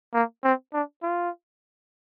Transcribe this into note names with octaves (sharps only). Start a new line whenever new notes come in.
A#3
C4
D4
F4